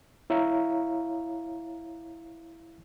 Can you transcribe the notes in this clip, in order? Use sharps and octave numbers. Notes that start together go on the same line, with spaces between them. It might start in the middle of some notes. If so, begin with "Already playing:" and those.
E4 C#5 E5 F5 A#5